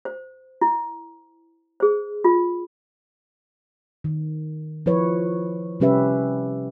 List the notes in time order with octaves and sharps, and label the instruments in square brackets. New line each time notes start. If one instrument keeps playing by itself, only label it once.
[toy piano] C5
E4
G#4 C5
F4
[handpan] D#3
F3 E4 B4 C#5
C3 G3 C#4 G4 B4 E5